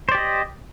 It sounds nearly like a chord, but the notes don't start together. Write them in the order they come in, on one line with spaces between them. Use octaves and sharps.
C5 D5 G4 D#5